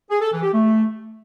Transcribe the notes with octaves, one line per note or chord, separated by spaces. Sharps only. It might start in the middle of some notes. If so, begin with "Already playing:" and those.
G#4
A4
E3
G4
A3